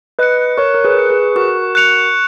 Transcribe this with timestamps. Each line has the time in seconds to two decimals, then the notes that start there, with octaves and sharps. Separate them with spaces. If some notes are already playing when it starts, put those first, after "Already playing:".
0.19 B4 D#5 F#6 C#7
0.58 A#4 C#5 C#6
0.74 A#4
0.85 G#4 B4
0.97 F#6 C#7
1.10 G#4 B4
1.36 F#4 A#4 C#6
1.75 F#6 C#7 F7